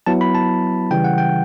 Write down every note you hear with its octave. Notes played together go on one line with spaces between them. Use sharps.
F#3 B3 E4 A5
B5
A5
C#3 E3 G3 G5
F#5
G5